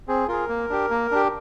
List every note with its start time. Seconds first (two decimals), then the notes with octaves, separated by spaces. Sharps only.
0.08 C4 G#4
0.28 F4 G#4 A#4
0.49 A#3
0.70 D4 G4
0.90 A#3
1.11 D4 G4